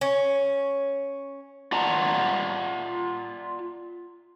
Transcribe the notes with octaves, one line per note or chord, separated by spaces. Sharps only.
C#4
F4 D5 F#5 A5 A#5